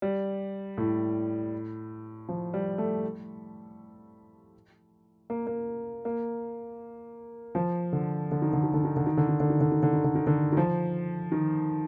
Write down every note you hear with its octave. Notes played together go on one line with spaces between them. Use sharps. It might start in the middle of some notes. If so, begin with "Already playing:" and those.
G3
A2
F3
G3
A3
A#3
A#3
A#3
F3
D3
D3
D#3
D3
D#3
D3
D#3
D3
D#3
D3
D#3
D3
D#3
D3
D#3
D3
D#3
D3
D#3
D3
D#3
F3
D#3